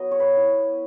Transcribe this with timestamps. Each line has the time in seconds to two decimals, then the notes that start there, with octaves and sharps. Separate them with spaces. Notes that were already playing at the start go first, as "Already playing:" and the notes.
Already playing: F#3 B3 D#5
0.11 C#5
0.20 B4
0.34 B3 E4